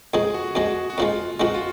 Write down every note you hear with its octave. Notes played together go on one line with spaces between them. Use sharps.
F2 F3 G#3 G#4
F#4
F2 F3 G#3 F#4
F#4
F2 F3 G#3 F4
F2 F3 G#3 F#4
F4